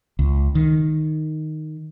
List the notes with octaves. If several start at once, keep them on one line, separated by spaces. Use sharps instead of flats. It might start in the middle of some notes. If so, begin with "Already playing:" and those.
C#2
D#3